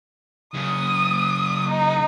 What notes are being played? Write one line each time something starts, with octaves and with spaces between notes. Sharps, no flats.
F#2 C#3 D#6
D#4